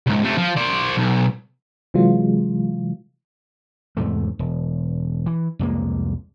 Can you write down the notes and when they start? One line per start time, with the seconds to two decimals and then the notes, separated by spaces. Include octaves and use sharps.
0.07 C#2 G#2
0.23 C3 A3
0.38 F3
0.57 C5 D5
0.97 B1
1.94 C3 E3 F#3 G#3 F4
3.97 E2 G#2 C3 A3
4.39 E1
5.26 E3
5.59 C2 F2 G#3 A#3